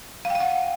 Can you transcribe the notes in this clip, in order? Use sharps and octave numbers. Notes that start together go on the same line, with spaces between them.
F5
G5
F5
F#5